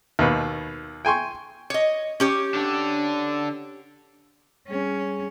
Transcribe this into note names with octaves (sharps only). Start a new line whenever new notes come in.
D#2 B2 B4
G5 G#5 C6 C#6
C#5 D#5
C#4 G4 C#5
D3 D4
G3 C#4 G#4